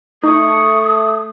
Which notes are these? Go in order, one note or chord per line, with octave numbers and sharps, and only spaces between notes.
A3 D#4 C#6 D#6